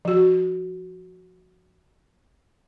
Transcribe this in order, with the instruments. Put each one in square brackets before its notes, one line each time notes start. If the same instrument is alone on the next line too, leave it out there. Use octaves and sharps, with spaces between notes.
[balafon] F3 F#4